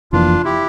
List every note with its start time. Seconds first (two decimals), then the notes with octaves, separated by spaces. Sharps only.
0.12 F1 F2 E3 A#3 D4 F4
0.44 E4 G4